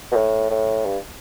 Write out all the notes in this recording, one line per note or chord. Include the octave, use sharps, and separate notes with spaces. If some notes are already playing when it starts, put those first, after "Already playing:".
B2
A2
A2
G2